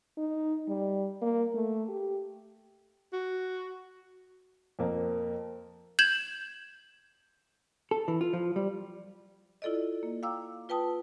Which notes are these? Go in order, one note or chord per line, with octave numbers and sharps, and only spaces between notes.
D#4
G3
A#3
A3
G4
F#4
F2 A#3
G6 G#6 E7 F#7
A4
E3
F4
F3
G3
E4 F4 A4 D5 D#5
A#3
F5 G5 A#5 D6 E6
F4 B4 G5 A5 D#6